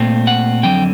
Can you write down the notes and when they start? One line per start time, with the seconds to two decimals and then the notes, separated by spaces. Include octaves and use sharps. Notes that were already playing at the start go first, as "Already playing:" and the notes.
Already playing: A#2 A3 C4
0.27 F#5
0.63 F2 D3 F#3 C4 G5